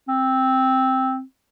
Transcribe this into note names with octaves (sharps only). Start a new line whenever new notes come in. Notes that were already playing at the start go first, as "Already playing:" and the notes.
C4